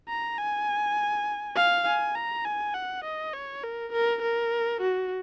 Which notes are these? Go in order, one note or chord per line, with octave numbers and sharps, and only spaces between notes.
A#5
G#5
F5
G#5
A#5
G#5
F#5
D#5
C#5
A#4
A#4
A#4
F#4